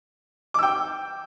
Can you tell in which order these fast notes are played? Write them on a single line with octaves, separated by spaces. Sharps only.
D6 E6 G5